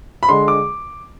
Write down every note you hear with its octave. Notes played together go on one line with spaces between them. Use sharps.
B5
D3 G#3 C6
D6